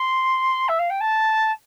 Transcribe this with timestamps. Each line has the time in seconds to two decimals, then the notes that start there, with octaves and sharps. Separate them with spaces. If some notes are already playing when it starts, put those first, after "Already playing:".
Already playing: C6
0.68 E5
0.79 F5
0.90 G5
1.00 A5